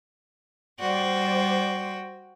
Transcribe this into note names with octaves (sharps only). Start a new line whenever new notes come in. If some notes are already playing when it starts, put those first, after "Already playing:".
G3 F#4 C5 D5 G5